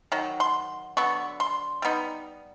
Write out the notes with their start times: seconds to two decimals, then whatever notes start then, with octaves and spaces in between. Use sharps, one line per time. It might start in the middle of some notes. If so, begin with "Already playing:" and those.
0.12 D#3 F#3
0.40 C6
0.97 D3 F#3 B3 C#6
1.40 C6
1.82 G3 B3 D#4